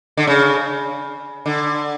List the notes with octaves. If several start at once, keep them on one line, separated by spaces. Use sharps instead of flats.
D3
C#3
D3